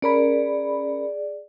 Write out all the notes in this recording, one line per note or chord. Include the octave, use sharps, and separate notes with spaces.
C#4 G#4 A#4 D5 B5